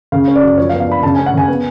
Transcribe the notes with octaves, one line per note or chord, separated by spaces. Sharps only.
C#3 F5
C#4
D5
F#2
F3 C#5
F5
B3
F5
D4 B5
C#3 A5
G#5
C#4
F#5
C#3 G#5
B3